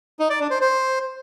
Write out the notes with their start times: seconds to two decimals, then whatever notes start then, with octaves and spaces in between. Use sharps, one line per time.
0.19 D#4
0.30 D5
0.40 D4
0.51 C5
0.61 C5